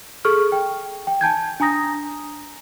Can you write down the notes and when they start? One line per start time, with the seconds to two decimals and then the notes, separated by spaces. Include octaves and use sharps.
0.25 G#4 A4 C#6 F6
0.52 G5
1.07 G5
1.21 G#5 A5 G6 G#6
1.60 D4 G#5 A#5 D#6 A#6